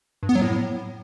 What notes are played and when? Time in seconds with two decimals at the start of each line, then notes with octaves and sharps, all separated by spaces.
0.23 G2
0.29 B3
0.35 F#3
0.42 A2